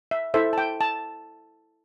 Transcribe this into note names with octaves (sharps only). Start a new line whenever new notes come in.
E5
E4 A4 C5 E5
A5
G5
A5